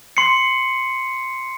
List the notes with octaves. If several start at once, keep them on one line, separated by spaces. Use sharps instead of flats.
C6 C7 C#7